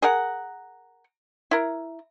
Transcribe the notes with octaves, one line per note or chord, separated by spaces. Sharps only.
G#4 A#4 F#5
E4 A#4